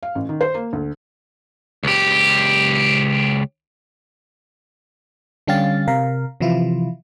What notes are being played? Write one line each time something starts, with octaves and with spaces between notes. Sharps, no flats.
F5
A1
D#3
C5
A#3
D2
C#2 G4
D3 G3 C#4 G4 F5 A6
C3 A#4 F5
C3 E3 F3 E4 F4